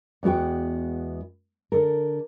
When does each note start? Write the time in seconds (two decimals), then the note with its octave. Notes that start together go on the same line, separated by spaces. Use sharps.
0.23 E2 G#3 B3 F#4 G5
1.72 D3 A4 A#4